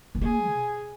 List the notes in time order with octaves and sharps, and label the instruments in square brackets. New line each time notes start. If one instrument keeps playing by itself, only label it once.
[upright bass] B3
[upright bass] A#3 [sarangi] G#4
[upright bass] B2